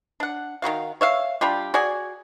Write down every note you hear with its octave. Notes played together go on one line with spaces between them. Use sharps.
D4 F#5
D#3 B3 F#4 F5
C#5 E5 F5
G3 D4 F4 G4
F#4 G#4 D5 G#5